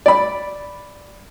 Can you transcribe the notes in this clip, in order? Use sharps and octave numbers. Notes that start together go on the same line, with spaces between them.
D5 B5